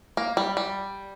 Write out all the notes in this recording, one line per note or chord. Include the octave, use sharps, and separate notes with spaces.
A#3
G3
G3